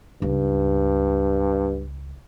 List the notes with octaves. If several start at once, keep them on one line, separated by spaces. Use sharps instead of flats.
C#2 G2